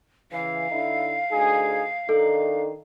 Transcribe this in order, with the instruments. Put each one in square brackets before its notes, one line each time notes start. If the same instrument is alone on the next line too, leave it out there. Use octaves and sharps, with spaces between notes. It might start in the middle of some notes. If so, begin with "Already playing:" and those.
[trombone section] C#3 E3 [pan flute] F5
[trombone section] D3 D#4 E4
D2 D#4 G#4
[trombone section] D#3 D4 D#4 [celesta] A4